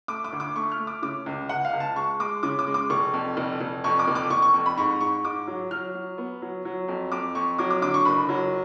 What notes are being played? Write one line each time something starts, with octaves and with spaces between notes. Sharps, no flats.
A3 D6
D6
D2
D6
A3 C#6
F6
A3
D6
C#3 D6
C#2
C#2 F#5
F5
C#2
A5
G#3 C#6
G#3 D6
C#3 D6
D6
G#3
D6
F1 C#6
F2
F1
F1
F2 C#6
D6
F1
D6
F1 C#6
C#6
F2
B5
G#2 C#6
G#2 C#6
G#2 D6
F#3
F#3 F6
F#3
B3
F#3
F#3
F2
F2 D6
F2 C#6
F#3 D6
D6
D3 D6
C#6
F#1 B5
F#3